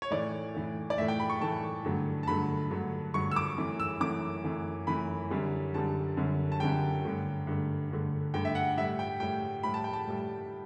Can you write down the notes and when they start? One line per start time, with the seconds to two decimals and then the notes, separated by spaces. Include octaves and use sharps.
0.02 C#5
0.10 A2 E3 A3 D5
0.54 A2 E3 A3
0.90 D5
0.98 A2 E3 A3 E5
1.08 G5
1.20 B5
1.30 C#6
1.41 A2 E3 A3 A5
1.85 G2 D3 F#3 A3
2.23 A5
2.27 G2 D3 F#3 A3 B5
2.70 G2 D3 F#3 A3
3.14 G2 D3 F#3 A3 C#6
3.31 E6
3.36 D6
3.58 F#2 E3 A3
3.80 E6
4.00 F#2 E3 A3 D6
4.44 F#2 E3 A3
4.87 F#2 E3 A3 B5
5.30 F#2 D3 G3
5.74 F#2 D3 G3 A5
6.17 F#2 D3 G3
6.52 A5
6.60 F#2 D3 G3 G5
7.05 G2 D3 A3
7.47 G2 D3 A3
7.91 G2 D3 A3
8.34 G2 D3 A3 G5
8.45 E5
8.55 F#5
8.78 A2 G3 E5
8.99 G5
9.20 A2 G3 G5
9.63 A2 G3 B5
9.74 A5
9.84 G5
9.93 A5
10.07 A2 G3